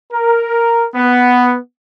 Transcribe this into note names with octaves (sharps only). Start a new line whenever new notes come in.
A#4
B3